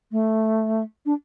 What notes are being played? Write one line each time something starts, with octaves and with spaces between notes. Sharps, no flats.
A3
D4